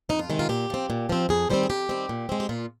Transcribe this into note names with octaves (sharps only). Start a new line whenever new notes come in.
F2 D#4
F4
C3 D#3 G#3 D#4
F4
A#2 G4
F3 C4
A#2
F3 C4
F2 G#4
D#3 G3 C4 C5
G#4
F2 G4
D#3 G3 C4
A#2
G#3 C4
G4
A#2 F4